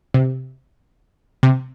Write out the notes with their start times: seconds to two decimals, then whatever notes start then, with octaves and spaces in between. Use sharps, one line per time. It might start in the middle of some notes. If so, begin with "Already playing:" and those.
0.14 C3
1.43 C3